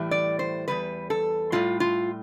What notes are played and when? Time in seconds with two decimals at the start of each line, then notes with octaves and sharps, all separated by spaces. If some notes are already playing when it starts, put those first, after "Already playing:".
Already playing: A2 E3 G3
0.11 D5
0.39 C5
0.68 E2 B2 G3 B4
1.10 A4
1.52 A2 G3 F4
1.80 F4